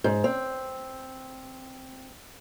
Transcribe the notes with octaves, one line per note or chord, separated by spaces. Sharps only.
G#2
C4